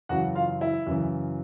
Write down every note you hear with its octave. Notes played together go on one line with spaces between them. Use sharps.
F#2 C#3 E3 F#4 F#5
F4 F5
E4 E5
F#2 C#3 E3